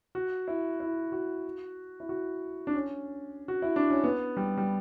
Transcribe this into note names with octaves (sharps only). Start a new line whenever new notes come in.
F#4
E4
E4
F#4
E4
F#4
D4
C#4
F#4
E4
D4
C#4
B3
G3
G3